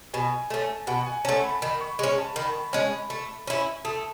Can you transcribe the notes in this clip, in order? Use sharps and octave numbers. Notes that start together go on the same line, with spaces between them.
B2 G#5
A3 C#4
B2 F#5
G#5
A3 C#4 A5
B5
D#3 B5
C#6
G#3 C#4 C#6
A5
D#3 B5
G#3 C#4
A3
C#4 E4
A3 D#6